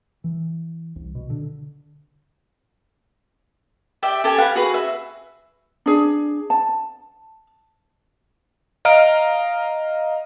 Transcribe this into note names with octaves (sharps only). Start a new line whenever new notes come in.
E3
C2
B2
D3
G4 D5 E5 G5
G4 A4 G#5
G4 B4 F5 F#5
F#4 G#4 B4
E5
D4 G#4
A5
D#5 F5 A#5 F6 D7